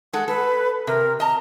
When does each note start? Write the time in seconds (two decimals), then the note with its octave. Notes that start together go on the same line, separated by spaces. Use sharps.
0.13 G#3 A4 F#5
0.28 A4 B4
0.87 C3 A#4
1.20 D#5 A5 A#5